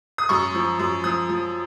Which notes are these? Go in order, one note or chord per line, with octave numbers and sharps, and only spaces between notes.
D#6
F#2 C#6
F3
F#2
F3 D#6
F3